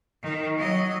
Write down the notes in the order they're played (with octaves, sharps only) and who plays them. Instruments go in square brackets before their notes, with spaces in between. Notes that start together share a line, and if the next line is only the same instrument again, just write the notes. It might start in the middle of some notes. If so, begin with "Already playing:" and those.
[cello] D#3
F#3 D#5